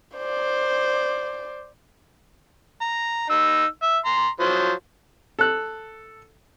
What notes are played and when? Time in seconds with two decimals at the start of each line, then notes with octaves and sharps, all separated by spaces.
0.16 C5 D5
2.81 A#5
3.30 D#4 E6
3.83 E5
4.05 A#5 C6
4.40 F3 F#3 C5
5.39 A4 F#6